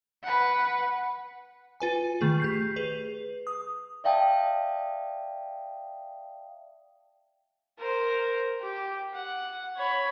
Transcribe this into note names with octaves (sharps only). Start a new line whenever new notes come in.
B4 F#5
F4 B4 G#5
D#3 A3 G#4
G4 G6 C7
G#4 B4 F7
D#6
D5 E5 F5 G5 A5 D#6
A#4 C5
G4
F#5
C#5 B5